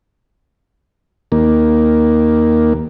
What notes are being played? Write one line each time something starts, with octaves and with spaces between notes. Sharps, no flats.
D#2 A#3